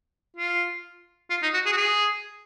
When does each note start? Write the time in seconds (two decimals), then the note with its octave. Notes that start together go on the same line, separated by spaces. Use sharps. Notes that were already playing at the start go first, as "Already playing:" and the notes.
0.37 F4
1.30 F4
1.43 D#4
1.54 F#4
1.66 G#4
1.72 F#4
1.77 G#4